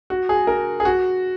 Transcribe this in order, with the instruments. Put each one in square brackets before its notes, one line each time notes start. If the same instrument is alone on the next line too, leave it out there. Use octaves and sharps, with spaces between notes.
[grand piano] F#4
G#4
A#4
G#4
F#4